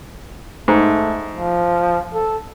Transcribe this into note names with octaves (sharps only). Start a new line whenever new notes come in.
G#2 A3
F3
A4